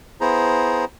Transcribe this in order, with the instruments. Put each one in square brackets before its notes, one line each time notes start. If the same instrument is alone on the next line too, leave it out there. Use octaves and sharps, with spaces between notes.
[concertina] B3 E4 G#4 C5 A#5